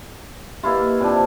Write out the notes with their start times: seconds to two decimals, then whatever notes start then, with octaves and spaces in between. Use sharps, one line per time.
0.63 A#3 E4 F4 G4 B4 D#5
1.01 C3 D4 F4 G4 D5